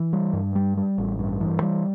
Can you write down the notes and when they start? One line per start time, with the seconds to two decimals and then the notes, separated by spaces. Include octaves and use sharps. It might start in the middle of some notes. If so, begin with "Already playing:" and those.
Already playing: E3
0.13 G3
0.33 G2
0.55 G3
0.77 G3
0.98 A1
1.19 G2
1.41 E3
1.62 G3